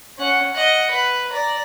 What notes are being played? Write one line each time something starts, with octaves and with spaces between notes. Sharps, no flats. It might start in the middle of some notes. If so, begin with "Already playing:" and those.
C#4 F#5
D#5 F#5
B4
D5 A#5